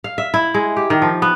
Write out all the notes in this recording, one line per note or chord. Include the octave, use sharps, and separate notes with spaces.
F5
E5
E4
G#3
G4
D#3
F3
B3